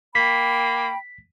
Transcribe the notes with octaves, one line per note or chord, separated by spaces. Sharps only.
A#3 G5 B5 B6